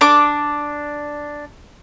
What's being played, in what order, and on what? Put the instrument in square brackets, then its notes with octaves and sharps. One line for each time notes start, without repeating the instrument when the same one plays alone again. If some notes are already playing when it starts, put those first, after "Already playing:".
[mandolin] D4 D6